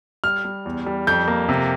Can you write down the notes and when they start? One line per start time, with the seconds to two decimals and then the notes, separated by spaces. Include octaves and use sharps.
0.24 G3 F6
0.45 G3
0.66 E2
0.86 G3
1.07 F2 G6
1.28 A#3
1.49 C3